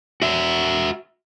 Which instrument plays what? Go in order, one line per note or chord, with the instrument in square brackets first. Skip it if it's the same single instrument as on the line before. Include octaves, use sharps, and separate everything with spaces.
[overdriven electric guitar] F#4 E5